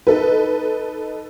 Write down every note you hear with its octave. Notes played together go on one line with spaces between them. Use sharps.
D#4 A4 B4